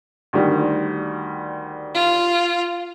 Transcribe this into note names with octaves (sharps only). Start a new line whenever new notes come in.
D2 D#3 G3
F4